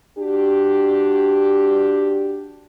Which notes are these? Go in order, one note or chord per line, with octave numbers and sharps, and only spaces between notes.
D4 F#4 G4